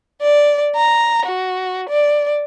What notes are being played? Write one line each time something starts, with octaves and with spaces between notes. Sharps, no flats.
D5
A#5
F#4
D5